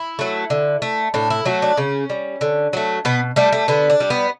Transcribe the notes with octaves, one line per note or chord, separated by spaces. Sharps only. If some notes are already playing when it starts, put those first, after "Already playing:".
Already playing: E4
F#3 A3
D3
A3
A2 D4
E4
F#3 A3 F#4
D4
C#3 C#4
G3
D3
F#3 A3
B2 B3
G3 A3
A3
D3 B3
D4
G3
B3